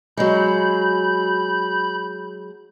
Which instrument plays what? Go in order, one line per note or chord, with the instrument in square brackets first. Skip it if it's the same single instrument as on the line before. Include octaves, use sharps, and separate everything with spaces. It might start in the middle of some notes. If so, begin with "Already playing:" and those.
[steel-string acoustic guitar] F#3 G#3 [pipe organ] B5 G6